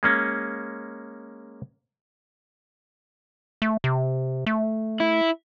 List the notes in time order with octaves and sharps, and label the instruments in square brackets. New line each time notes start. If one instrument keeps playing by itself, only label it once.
[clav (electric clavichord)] G#3 A#3 C#4
[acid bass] A3
C3
A3
[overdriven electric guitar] E4